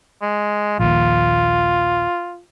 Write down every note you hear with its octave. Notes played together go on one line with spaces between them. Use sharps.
G#3
A#1 D#2 F4